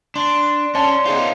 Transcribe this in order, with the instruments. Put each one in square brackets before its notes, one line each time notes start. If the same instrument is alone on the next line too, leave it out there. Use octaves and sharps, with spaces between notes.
[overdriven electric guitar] D4 [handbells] C6 A6
[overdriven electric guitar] C#4 [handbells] C#5 D5 C6 [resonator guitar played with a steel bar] A5
[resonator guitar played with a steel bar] B3 G#4 C5 [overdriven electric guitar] D#4 F4